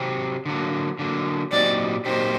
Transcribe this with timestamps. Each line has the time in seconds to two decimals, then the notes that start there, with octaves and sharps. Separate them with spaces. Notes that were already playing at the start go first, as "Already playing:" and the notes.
Already playing: C3 F#3 C4
0.46 D3 F#3 A#3
0.99 D3 F#3 A#3
1.52 A#2 F#3 C4 D#4 G4 D5
2.06 A#2 F#3 C4 D#4 G4 C5